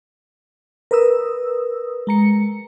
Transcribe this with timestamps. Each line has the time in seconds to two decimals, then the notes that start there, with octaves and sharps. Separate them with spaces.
0.91 A#4 B4 D#6 E6
2.07 G#3 A#5 C#7